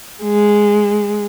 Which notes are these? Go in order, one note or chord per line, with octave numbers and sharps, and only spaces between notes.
G#3